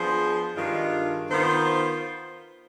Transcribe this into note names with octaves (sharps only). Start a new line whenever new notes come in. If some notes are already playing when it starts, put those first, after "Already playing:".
Already playing: F3 B3 D4 G#4 C5
G2 D#3 G#3 D4 F4
D#3 B3 F4 C5